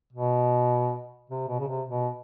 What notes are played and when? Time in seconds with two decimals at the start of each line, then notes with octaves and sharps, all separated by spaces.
0.13 B2
1.30 C3
1.48 B2
1.60 C#3
1.68 C3
1.88 B2